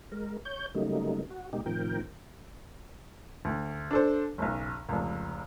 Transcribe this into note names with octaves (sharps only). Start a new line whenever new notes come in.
G#3 A#4
C#5 G6
C#3 F#3 G3 A3 A#3 D#4
F#4
B2 G#3 A#3 D#4 G4
A2 C3 D#3 F3 A#4 G5
D2
D4 A4 C5
F#1 B1
F1 C#2